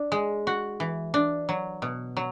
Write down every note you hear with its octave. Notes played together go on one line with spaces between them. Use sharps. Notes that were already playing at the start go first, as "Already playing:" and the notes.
Already playing: D4
G#3
F#4
E3
D4
F#3
B2
F#3